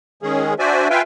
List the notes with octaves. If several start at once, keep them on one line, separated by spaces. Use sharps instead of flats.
D#3 G#3 C#4 G#4
D4 F#4 C5 D5 E5 G#5
F4 B4 E5 F5 G5 G#5